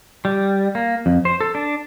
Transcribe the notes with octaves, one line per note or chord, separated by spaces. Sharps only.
G3
A#3
F2
C5
A4
D4